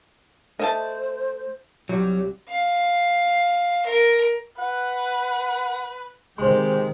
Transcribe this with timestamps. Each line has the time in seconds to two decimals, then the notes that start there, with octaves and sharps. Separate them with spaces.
0.59 A3 C5 D#5 E5 A5
1.89 C2 F#3 G3 G4
2.49 F5
3.86 A#4
4.59 B4 F#5
6.38 C3 D#3 G#3 G4 C5 C6